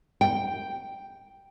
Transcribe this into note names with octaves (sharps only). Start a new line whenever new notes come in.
G5